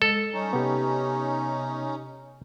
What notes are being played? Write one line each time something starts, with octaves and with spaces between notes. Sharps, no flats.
G#3 A4
G3 C#4 D#4
C3 B3 G4